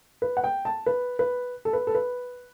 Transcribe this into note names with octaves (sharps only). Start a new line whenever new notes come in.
B4
F#5
G5
A5
B4
B4
A4
B4
A4
B4